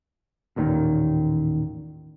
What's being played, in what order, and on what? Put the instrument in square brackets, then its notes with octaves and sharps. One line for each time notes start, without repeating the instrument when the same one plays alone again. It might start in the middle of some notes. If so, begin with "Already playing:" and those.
[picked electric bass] A1 D#2 A#2 D#3